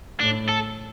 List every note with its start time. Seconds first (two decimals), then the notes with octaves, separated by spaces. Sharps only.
0.20 A2 D4
0.49 A4